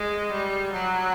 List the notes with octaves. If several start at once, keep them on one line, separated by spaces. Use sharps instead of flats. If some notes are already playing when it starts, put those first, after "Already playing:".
Already playing: G#3
G3
F#3